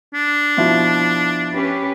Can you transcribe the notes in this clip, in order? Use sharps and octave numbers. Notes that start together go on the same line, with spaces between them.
D4
B2 F3 E4
C#4 G4 B4